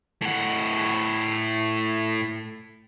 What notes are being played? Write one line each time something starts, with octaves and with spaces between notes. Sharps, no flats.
A2 F#5